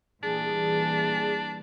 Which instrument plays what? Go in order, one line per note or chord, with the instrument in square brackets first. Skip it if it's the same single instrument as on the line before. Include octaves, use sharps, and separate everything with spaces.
[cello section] A#2 E3 G3 [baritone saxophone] D4 [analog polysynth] G#4